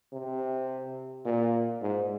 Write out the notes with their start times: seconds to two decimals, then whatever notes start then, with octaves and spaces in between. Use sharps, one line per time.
0.13 C3
1.25 A#2
1.82 G#2